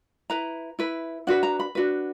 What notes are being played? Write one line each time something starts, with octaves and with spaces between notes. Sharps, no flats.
E4 B4 A#5
E4 B4
D4 F#4 B4 F#5
A#5
B5
D4 F#4 B4